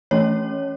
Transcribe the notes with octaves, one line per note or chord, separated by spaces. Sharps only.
E3 A3 C#4 C#5